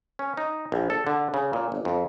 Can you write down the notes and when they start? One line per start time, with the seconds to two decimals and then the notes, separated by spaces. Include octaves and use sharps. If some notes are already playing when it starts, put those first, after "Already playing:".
0.19 C#4
0.37 D#4
0.72 A#1
0.90 A4
1.07 D3
1.34 C#3
1.53 A#2
1.72 G1
1.85 F2